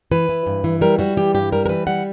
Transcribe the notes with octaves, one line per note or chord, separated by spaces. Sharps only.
E3 B4
E3
G2
E3
G3 A#4
G3 F#4
E3 G4
G2 G4
G3 A#4
A#4
E3 B4
G3 F#5